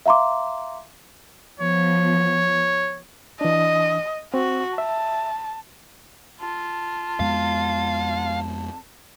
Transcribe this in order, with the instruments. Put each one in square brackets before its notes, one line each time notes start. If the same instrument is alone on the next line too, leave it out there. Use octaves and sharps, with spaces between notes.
[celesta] E5 F5 A#5 C6 D6
[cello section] F3 B3 [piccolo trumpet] C#5
[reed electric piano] E3 D4 [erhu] D#5
[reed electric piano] C4 [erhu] F#4
[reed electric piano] E5 [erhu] A5
[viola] F4 [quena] A5
[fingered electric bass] F2 G#3 B3 [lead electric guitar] F5